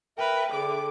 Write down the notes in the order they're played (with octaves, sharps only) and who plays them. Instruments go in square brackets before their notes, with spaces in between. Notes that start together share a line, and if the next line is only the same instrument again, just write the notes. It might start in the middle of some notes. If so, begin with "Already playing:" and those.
[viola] A#4 B4 [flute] E5 [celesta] G5
[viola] D3 D6 [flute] G#4